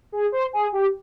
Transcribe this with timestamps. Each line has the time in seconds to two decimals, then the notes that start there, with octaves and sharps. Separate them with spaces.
0.12 G#4
0.32 C5
0.53 G#4
0.73 G4